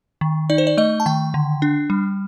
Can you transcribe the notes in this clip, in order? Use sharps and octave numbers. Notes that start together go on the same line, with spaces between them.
D#3
D#4 D5
C5
D5
A3 D#5
A5
D#3 G5
D3
D4
G3